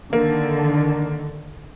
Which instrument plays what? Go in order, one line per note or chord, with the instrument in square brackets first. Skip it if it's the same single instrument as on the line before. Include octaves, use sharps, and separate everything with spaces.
[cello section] D3 D#3 [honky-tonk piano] A#3